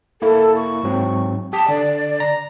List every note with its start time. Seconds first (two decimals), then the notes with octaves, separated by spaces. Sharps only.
0.22 A#3 E4 A4
0.56 C#6
0.83 G#2 F#3 C4
1.53 G4 A5 D#6 B6
1.69 D3 D5
2.20 A#5 A#6